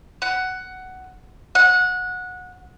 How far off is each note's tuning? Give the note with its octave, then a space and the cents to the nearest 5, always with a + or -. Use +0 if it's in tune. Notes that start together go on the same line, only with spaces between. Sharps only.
F#5 +10
F#5 -20